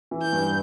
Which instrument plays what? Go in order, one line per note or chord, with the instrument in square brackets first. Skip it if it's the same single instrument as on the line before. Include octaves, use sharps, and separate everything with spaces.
[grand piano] E3
[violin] G6
[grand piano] G2